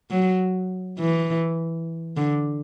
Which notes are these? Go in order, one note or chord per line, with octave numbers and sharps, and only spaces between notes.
F#3
E3
D3